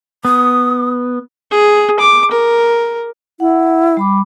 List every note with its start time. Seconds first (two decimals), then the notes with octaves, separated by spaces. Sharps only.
0.25 B3 D#6
1.51 G#4
1.99 D6
2.31 A#4
3.40 E4 F#5
3.97 G3 B5 D6